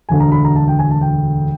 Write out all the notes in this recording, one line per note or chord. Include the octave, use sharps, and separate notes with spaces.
E1 D2 D3 G#5
A#5
B5
A#5
A5
G5
G#5
A5
G5